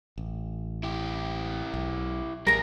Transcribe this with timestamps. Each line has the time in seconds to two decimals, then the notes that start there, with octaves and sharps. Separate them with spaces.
0.18 A1
0.83 E4 G4
1.74 B1
2.47 A1 G3 A#3 G#4 A#4 A#5